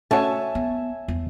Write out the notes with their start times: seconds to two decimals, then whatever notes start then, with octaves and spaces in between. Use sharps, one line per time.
0.11 A3 C#4 F#4 C#5 E5 G#5 A5
0.55 B3
1.08 E2